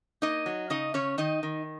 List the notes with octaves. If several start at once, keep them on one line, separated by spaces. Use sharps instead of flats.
A#3 D#4 D#5
F#3
C#3 D#4 D#5
C#3 C#4 C#5
D#3 D#4 D#5
D#3